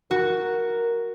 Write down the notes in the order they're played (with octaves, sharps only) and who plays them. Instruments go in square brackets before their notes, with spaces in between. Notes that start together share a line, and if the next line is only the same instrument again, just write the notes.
[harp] F#4 [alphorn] A#4